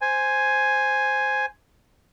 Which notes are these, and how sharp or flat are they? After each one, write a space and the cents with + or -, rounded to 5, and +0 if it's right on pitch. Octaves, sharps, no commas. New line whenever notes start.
C5 +0 G#5 +0